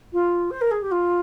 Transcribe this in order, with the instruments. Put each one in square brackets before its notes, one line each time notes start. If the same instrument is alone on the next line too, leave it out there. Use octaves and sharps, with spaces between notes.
[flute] F4
C5
A#4
G#4
G4
F4